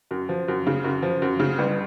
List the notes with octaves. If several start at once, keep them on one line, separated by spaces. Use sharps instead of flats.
F#2
F3
F#2
C#3
F#2
F3
F#2
C#3
G1